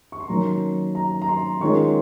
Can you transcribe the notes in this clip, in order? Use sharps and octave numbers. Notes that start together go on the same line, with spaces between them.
C#6
C6
D#3 F#3 A#3 C#4 A#5
A#5
A#5
C6
D#3 G#3 C#4 F4 C#6